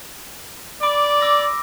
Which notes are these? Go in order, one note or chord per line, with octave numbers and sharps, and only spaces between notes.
D5 B5 D6 D7
D6 E6 A#6